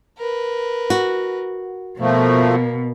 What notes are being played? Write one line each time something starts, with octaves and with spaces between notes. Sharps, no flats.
A#4 B4
F#4
B2 F3 A3 A#3